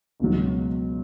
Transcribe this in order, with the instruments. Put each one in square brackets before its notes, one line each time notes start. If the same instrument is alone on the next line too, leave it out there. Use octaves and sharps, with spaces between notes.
[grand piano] C#2 B2 F#3